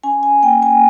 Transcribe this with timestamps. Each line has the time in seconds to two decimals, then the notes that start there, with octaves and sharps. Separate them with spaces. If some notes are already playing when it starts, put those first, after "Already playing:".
0.03 C#4 G#5
0.23 G#5
0.43 A#3 G5
0.63 G#5